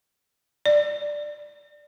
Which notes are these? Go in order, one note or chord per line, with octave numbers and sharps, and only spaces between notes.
D5